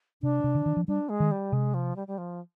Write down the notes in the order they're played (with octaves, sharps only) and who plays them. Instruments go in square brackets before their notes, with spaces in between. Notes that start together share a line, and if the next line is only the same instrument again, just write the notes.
[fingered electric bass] C3 [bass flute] D4
[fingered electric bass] C3
D3
D#3
F3
[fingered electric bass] G3 [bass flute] D4
[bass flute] G#3
[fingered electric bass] D#3
[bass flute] G3
[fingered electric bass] C3 [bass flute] G#3
[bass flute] F3
G3
G3
F3